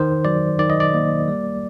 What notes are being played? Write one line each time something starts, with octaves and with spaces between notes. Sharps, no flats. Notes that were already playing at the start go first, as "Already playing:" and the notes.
Already playing: D#3 C5
F#3 D5
D#3 D5
D#5
D5
A#3
G3